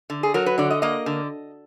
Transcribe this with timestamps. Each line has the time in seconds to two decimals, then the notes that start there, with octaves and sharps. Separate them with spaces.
0.10 D3
0.23 G#4
0.34 F#3 A#4
0.46 B4
0.58 D3 D5
0.71 D#5
0.82 A#3 D#5
1.06 D3